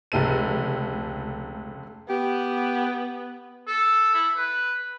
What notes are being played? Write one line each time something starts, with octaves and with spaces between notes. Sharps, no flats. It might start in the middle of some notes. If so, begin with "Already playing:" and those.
F1 C#2 A3 A4 D#7
B3 G4
A4
E4
B4